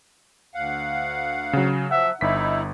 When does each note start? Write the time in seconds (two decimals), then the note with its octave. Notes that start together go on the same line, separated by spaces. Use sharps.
0.55 D2 F5 F#5
1.53 C#3 F#3
1.91 F3 F#3 E5 F#5
2.21 G1 D#4 E4 E5 B6